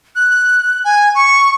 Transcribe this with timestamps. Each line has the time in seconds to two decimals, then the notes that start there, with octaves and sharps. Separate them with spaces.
0.15 F#6
0.84 G#5
1.15 C#6